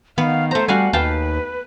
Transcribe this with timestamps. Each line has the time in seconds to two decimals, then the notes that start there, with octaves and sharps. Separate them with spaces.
0.18 D#3 B3 F5
0.51 A3 C5 A#5
0.68 G3 F#4 F5 F#5 G#5
0.93 D#2 B4 F5 G5 A5